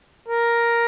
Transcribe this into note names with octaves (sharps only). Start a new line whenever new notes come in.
A#4